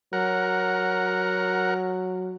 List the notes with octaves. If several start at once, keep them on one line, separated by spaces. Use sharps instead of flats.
F#3 A#4 F#5